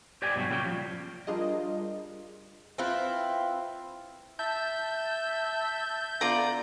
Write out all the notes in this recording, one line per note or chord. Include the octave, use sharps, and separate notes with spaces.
G4 C5 D5 G5 G#5
G2 B2 D3 F#3 G3
A#2 C#3 G3 C#4 G5
F3
G3 D4 F4 G#4 A#4 D#5
C4 E4 F4 B4
E5 A5 G6
D3 B3 F4 D5 A#5